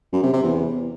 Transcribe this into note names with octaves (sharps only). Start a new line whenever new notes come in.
F#2
C3
C3
E2